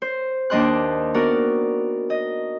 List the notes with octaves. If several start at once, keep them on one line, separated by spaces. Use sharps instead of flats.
C5
D#2 D4 D#5 C6 F#6
B3 D#4 F#4 A#4 D5
D#5